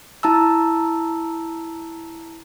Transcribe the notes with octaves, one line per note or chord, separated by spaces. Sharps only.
E4 A5 A#5 E6